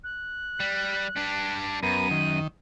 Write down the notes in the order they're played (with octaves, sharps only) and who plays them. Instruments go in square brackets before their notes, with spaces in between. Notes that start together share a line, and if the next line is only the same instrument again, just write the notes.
[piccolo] F#6
[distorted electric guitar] G3
G3 D4
[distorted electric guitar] F#2 [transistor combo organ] B3 A#4 [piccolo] D#7
[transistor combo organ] D#3